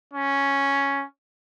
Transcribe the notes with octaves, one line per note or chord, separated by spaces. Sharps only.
C#4